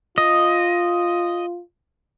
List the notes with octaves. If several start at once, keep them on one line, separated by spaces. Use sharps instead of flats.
F4 D#5